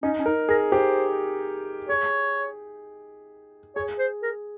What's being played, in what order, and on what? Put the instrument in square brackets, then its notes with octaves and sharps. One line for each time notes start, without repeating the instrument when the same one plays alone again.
[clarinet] C#4 [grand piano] D#4
[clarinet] C#4
[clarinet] D#4 [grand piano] A#4
[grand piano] G#4 [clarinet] A#4
[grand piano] G4 [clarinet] C5
[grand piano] G#4 [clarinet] C#5
[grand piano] G#4 [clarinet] C#5
[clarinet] C5
A#4